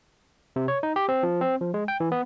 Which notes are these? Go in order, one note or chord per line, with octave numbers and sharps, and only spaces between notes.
C3
C#5
D#4
G4
C4
F3
C4
F3
G#3
G5
E3
B3